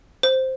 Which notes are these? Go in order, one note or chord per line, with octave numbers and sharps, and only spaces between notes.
C5